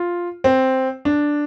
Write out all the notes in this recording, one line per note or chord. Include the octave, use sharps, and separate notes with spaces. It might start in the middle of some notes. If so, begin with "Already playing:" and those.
Already playing: F4
C4
D4